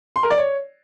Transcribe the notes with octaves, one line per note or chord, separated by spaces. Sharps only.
C6
A#4
D5
C#5